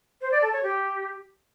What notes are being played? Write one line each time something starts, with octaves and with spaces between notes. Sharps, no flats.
C5
D5
A4
C#5
G4